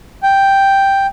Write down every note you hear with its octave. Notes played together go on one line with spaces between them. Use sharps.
G5